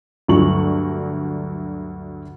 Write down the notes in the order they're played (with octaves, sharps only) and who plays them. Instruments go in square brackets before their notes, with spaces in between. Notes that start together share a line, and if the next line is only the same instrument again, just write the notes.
[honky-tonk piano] D2 G2 F#3 C#6 F#7